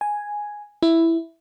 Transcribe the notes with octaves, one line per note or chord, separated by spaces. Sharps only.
G#5
E4